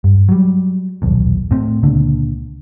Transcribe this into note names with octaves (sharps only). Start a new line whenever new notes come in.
G2
F#3 G3
D#1 B1 E2
A2 C4
C#2 A#2 D3